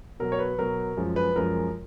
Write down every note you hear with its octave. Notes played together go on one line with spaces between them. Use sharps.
B2 F#3 A#4
C#5
B4
B2 F#3 A#4
F#2 F3 G#3
B4
F#2 F3 G#3 A#4